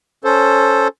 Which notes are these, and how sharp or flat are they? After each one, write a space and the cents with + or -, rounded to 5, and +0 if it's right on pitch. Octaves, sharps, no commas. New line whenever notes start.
C#4 +10 A4 +0 C5 +10